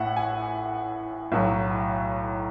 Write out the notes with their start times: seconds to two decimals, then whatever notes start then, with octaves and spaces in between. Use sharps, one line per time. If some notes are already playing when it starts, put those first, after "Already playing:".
Already playing: A1 A2 E3 E5 F#5
0.16 G#5
1.32 B1 A2 F#3